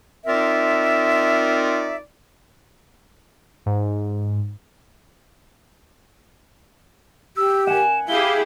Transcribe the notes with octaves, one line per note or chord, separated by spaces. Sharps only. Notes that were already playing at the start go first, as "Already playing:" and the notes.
C4 D#4 F4 A#4 D5 E5
G#2
G4 E6
F#5 G#5 E7
E4 G4 G#4 F5 G7